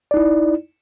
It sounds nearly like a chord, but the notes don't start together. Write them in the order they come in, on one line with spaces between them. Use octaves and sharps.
D5 D#4 E4